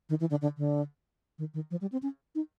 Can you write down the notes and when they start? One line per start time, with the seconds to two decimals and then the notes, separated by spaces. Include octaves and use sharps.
0.09 D#3
0.20 E3
0.30 D3
0.42 D3
0.57 D3
1.38 D#3
1.54 D#3
1.71 F3
1.81 G3
1.92 C4
2.03 C#4
2.35 D#4